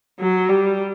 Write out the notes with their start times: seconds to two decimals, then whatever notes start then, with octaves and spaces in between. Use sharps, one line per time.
0.20 F#3
0.49 G3